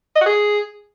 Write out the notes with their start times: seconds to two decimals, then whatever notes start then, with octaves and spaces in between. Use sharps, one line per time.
0.16 D#5
0.21 F#4
0.26 G#4